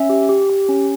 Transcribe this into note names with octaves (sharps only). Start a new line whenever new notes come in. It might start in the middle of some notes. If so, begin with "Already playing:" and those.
Already playing: C#4 E5
G4
G4
G4
C#4